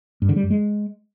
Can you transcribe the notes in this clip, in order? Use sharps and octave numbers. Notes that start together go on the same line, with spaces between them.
G2
D3
G3
F#2
G#3